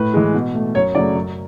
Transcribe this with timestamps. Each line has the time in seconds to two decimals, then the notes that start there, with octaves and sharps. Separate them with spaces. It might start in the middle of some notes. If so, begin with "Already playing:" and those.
Already playing: A2 B4
0.14 E3 G#3
0.34 B2
0.54 A3
0.75 F#2 C#5
0.95 C#3 F#3 A3 D5
1.15 F#2